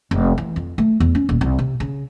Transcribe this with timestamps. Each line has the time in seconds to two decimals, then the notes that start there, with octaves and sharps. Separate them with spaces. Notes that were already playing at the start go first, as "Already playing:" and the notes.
0.11 F1
0.38 E3
0.56 F2
0.78 A3
1.00 E2
1.15 C#4
1.29 D#1
1.41 C2
1.59 C3
1.80 C#3